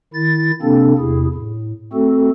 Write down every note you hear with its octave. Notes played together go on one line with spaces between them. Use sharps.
D#3 E4 A6
C3 A#3 C4 D4 A4
E2 C3 E4 G#4
A2
A3 C4 F#4 A4